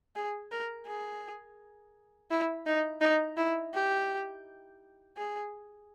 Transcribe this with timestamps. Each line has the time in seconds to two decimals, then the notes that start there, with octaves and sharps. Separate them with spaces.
0.16 G#4
0.51 A#4
0.87 G#4
2.31 E4
2.66 D#4
3.01 D#4
3.37 E4
3.74 G4
5.17 G#4